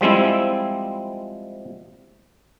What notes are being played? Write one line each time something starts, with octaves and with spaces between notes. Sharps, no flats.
F3 G3 G#3 C4 E4